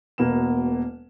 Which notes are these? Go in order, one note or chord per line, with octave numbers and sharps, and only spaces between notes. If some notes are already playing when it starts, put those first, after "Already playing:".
E1 B2 A#3 B3 E7